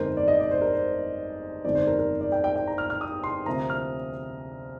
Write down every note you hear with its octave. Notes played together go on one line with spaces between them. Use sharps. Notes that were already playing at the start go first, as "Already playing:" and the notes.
Already playing: G1 F2 D#3 G#3 A#4 C5
D5
D#5
D5
C5
A#4
C5
G1 F2 D#3 G#3 C4 D5
C5
A#4
A#4
D5
G5
G5
G5
A#5
F6
F6
D#6
C6
D2 C3 F3 A#3 A#5
F6